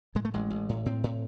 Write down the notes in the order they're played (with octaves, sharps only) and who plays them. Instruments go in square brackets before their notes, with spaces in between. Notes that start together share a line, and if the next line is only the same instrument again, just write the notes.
[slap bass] A2 G#3
A3
A1 G#3
A1
A2
A2 C4
A2